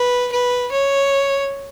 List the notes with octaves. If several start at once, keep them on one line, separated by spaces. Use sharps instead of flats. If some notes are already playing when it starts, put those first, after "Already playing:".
Already playing: B4
B4
C#5